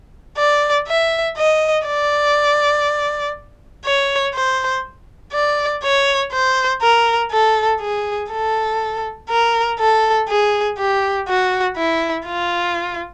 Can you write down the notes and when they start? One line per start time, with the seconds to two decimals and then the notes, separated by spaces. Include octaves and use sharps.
0.38 D5
0.87 E5
1.37 D#5
1.87 D5
3.85 C#5
4.34 C5
5.33 D5
5.83 C#5
6.32 C5
6.82 A#4
7.31 A4
7.81 G#4
8.31 A4
9.30 A#4
9.79 A4
10.29 G#4
10.78 G4
11.28 F#4
11.77 E4
12.27 F4